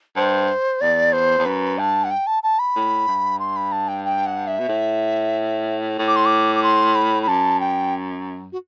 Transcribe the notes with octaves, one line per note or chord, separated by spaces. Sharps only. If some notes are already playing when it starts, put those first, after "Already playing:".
G2 C5
E2 D5
C5
E2
F#2 B4
G2 A5
F#5
G5
A5
A5
B5
A2
G2
C6
B5
A5
G5
G5
F#5
E5
B2
A2
A2
D6
C6
D6
D6
C6
B5
B5
F#2 A5
G5
F#4